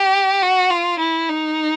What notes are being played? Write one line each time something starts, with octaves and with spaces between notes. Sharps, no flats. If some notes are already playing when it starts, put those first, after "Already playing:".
Already playing: G4
F#4
F4
E4
D#4